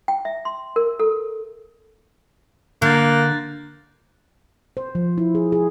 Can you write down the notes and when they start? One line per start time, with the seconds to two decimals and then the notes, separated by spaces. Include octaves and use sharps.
0.08 G5
0.25 E5
0.45 C6
0.76 A#4
1.00 A4
2.82 D3 A#3 F#6 G6 A6
4.77 C5
4.95 F3
5.18 E4
5.35 G#4
5.52 G#4